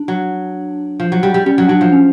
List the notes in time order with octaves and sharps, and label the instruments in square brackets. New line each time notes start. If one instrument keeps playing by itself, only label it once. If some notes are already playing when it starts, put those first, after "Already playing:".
Already playing: [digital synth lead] D4
[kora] F#3
F3
F#3
G3
G3
[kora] G3 [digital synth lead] C#4
[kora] F#3
[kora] F#3 [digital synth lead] D4
[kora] F3
[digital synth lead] C#4